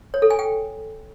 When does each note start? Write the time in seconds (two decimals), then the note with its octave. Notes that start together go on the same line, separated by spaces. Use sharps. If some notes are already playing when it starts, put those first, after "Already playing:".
0.14 C#5
0.22 A4
0.30 G#5
0.39 G5